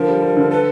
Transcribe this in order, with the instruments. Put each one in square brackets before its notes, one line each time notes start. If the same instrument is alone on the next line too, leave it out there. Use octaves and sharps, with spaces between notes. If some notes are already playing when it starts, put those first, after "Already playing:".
Already playing: [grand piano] D3 F3 [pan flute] A#4
[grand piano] G3
G3
D3
[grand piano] A4 [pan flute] B4